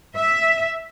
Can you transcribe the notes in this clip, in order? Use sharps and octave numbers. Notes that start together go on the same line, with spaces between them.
E5